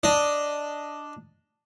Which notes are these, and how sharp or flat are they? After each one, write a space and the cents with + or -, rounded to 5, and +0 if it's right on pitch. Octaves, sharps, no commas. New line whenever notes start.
D4 +0 D#5 +0